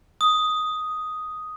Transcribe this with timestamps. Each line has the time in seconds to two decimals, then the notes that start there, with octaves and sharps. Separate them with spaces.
0.21 D#6